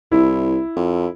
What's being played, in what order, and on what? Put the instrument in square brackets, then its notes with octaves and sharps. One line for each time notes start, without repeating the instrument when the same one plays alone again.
[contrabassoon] C2 [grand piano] E4
[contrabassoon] F2